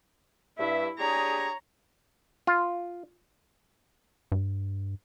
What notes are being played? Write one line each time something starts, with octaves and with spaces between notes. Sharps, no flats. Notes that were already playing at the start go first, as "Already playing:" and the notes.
G2 E4 E5
D4 G4 G#4 C#5 A#5
F4
G2